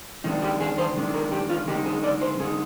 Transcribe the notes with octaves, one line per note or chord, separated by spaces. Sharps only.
D#3 G#3 D4 D#4
G4
G#4
C5
D#3 G#3 D4
A#4
G4
F4
D3 G#3 D#4 G4
G#4
D5
C5
D3 G#3 D#4 G#4